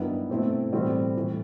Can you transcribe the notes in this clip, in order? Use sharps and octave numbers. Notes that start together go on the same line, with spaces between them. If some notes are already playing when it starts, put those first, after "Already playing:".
Already playing: G2 D#3 F#3 B3 E4
B2 A3 C4 E4
A2 E3 G3 C4 F#4
A2 E3 G3